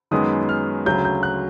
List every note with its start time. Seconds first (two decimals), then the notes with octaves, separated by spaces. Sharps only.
0.11 F#2 D#3 G#3 B3 D#6
0.49 F6
0.86 D2 C#3 F#3 G6
1.05 G6
1.23 F#6